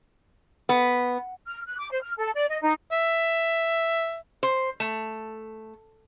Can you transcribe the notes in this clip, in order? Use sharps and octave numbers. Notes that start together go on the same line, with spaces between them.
B3
F6
F#6
D6
C5
F6
A4
D5
D#5
D#4
E5
C5
A3